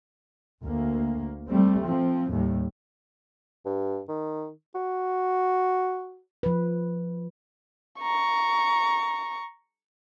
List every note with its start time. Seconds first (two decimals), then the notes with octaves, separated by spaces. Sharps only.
0.64 D2 A#3
1.50 G3 A3 C4
1.84 F3 C4
2.31 D#2 A2 G3
3.65 G2
4.09 D#3
4.75 F#4
6.43 F3 B4
8.01 A#5 C#6